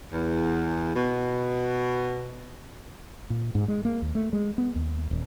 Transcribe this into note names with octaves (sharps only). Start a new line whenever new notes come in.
E2
B2
A#2
G#2
G#3
A#3
D#2
A3
G#3
B3
D#2
D#1